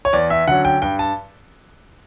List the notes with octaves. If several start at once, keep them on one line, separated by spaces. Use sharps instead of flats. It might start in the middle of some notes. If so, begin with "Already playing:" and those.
C#5
E2 D5
E5
D3 F#3 C#4 F#5
G5
G2 G5
A5